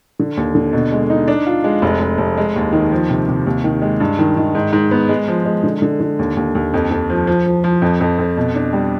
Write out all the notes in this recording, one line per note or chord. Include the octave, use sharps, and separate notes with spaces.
D3
D#2
D3
B2
G#3
D#4
D4
F4
G#3
F1
F1
F1
G#3
D#2
D#3
F3
C3
C3
D#2
D#3
G#3
G2
D#3
D#3
G#2
G#2
B3
G#3
F3
G#3
D3
D3
D3
D#2
D#2
D#2
F2
F2
F3
F3
F3
F3
F2
F2
F2
B2
D4
G3